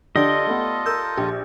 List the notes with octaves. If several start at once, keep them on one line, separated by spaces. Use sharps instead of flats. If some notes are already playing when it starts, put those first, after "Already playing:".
D3 F4 G4 A4 D5 D#5 G7
A3 B3
A#4 E6 G6
A#1 G4